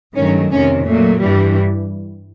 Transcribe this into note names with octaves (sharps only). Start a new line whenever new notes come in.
G2 D#3 F#3 A3 C#4
F2 C3 D#3 C#4
A#2 F#3 A3
G2 E3 G3